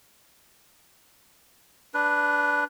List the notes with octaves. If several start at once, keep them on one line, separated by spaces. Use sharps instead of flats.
D4 B4